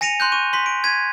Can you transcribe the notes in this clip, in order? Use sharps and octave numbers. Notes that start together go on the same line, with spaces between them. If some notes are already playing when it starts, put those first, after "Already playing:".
G#5 A#6 C#7 D#7 F7
C6 F#6 G6
C#6 D#7
C6 B6
D7
G#6 B6 D#7